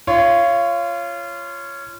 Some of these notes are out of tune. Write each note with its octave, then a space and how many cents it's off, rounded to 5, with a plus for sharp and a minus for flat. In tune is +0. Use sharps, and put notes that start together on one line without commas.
F4 -25 C#5 +0